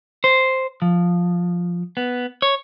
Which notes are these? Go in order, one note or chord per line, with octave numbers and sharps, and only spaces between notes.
C5
F3
B3
C#5